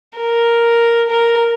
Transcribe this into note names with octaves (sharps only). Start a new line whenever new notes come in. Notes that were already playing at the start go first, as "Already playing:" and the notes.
A#4
A#4